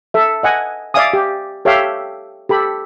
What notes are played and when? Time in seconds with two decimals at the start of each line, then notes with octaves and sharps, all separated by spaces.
0.14 A4 E5
0.43 D#5 F#5 G#5
0.94 D5 E5 F5 G#5 D#6
1.13 G4
1.65 G4 A4 C#5 E5 F5 G5
2.49 G4 A4 B5